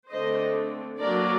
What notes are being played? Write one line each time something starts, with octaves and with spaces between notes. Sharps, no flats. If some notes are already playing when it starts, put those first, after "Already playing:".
D3 A3 C4 C5 D#5
F#3 A#3 D4 A#4 D5